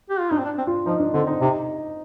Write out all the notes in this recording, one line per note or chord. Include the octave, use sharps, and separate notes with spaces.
G4
F4
D4 D#4
C4
D4
C4
F4
F3 D#4
D4
D3 C4
D#4
C3 D#4